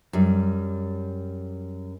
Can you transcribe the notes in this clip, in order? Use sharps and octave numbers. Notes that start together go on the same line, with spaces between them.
F#2 G3